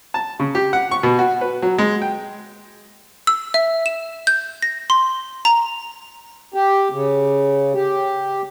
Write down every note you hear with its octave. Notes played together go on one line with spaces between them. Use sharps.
A5
C#3
G4
F#5
C#6
B2
F#4
B4
F#3
G#3
G5
E6
E5
E7
G6
A#6
C6
A#5
G4
C#3
G4